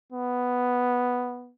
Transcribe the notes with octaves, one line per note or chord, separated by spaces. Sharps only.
B3